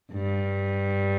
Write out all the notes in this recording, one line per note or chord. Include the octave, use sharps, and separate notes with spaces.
G2